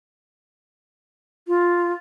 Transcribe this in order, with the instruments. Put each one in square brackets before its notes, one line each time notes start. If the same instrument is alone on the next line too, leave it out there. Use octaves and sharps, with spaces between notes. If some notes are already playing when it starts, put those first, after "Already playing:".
[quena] F4